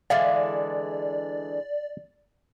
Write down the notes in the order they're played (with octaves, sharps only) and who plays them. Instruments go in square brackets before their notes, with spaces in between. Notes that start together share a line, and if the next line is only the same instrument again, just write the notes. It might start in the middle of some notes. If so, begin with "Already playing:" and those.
[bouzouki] D3 E3 G#3 [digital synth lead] D5 [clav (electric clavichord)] F5